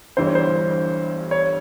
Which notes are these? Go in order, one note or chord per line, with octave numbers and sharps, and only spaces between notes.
G1 G2 E3 G3 C5
C#5
C5
C#5